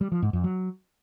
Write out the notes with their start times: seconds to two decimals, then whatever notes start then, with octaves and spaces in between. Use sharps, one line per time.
0.01 G3
0.12 F3
0.22 G#2
0.33 F2
0.44 F#3